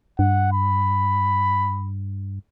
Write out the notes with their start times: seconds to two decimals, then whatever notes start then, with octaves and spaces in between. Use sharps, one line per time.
0.19 G2 F#5
0.53 B5